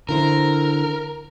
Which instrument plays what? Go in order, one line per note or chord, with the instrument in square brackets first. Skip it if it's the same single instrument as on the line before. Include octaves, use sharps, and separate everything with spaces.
[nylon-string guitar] D3 E4 C5 [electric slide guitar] A#4